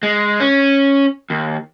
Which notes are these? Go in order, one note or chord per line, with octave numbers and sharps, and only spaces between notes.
G#3
C#4
D#2